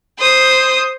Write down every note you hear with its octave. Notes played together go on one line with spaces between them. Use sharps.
C5 D#6